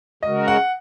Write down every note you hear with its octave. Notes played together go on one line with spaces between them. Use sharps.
C#3 G#3 F#4 A#4 D#5
F#5